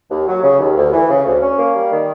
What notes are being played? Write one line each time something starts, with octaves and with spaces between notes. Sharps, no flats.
D#2
F#3
C#3
D#2
D2
E3
C#3
D2
C#4
A#3
G3
D#3